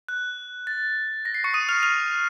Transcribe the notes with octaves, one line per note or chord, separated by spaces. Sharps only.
F#6
A6
A#6
C7
C#6 C#7
D#6 D#7
F6 F7
F6 F7